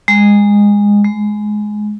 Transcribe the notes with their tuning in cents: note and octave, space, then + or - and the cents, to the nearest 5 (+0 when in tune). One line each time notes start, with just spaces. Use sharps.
G#3 -20
G#3 +15